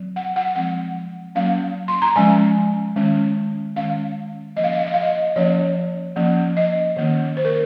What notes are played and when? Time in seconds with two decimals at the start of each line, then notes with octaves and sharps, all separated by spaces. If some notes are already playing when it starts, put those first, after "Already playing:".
Already playing: F#3 C4
0.16 F#5
0.36 F#5
0.55 F3 G#3 C4 F#5
1.35 F#3 A#3 C#4 F5
1.88 C6
2.02 A#5
2.16 F3 G#3 C#4 G#5
2.96 D#3 G#3 C#4
3.76 D#3 G#3 C#4 F5
4.56 F3 A#3 C#4 D#5
4.64 F5
4.72 D#5
4.79 F5
4.86 D#5
4.94 F5
5.01 D#5
5.36 F3 A#3 C#4 C#5
6.16 F3 A#3 C#4
6.57 D#5
6.97 D#3 A#3 C#4
7.37 C5
7.45 A#4